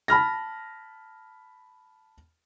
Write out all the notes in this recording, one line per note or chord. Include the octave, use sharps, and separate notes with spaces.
A5 B5 F6 A#6